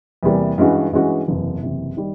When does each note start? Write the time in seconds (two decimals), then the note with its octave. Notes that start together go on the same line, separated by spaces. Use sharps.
0.23 E2 C3 E3 G3 A#3
0.58 G2 E3 G#3 C#4 F#4
0.92 G2 E3 G#3 C#4 F#4
1.28 F#1 E2 C3
1.63 F#1 E2 C3
1.97 D#3 G3